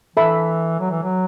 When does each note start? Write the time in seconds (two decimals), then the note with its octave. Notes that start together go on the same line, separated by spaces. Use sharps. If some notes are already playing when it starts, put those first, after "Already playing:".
0.16 E3 A4 E5 B5
0.80 F#3
0.90 E3
1.02 F#3